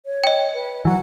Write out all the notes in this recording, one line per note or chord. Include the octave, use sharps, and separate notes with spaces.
C#5
D#5 G5
B4
E3 F#3 F#5